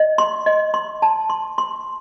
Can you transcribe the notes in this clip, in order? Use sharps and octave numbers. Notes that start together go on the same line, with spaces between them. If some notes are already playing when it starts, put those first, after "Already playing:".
Already playing: D#5
C6
D#5
C6
A5
C6
C6